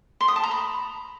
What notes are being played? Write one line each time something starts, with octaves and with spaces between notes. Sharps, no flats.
C6
D#6
A5
A#5
B5